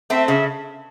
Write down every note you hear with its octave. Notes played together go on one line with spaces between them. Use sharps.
A3 C4 E5
C#3 E5